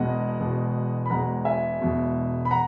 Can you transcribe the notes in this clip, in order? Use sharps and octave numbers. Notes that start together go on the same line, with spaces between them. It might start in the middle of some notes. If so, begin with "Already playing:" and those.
Already playing: E1 E2 B2 G#3 D#5 F#5
E1 E2 B2 G#3
B5
E1 E2 B2 G#3 F#5 A#5
E5 G#5
E1 E2 B2 G#3
B5
F#5 A#5